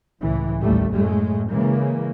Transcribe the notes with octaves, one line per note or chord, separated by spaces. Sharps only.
C#2 A2 E3
A1 D#2 G3 A3
F#2 A2 G#3 A3
C#3 E3 G#3 A#3